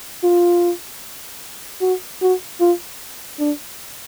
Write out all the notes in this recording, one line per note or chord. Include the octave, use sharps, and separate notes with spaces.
F4
F#4
F#4
F4
D4